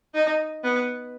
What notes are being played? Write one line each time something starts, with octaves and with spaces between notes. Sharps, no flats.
D#4
B3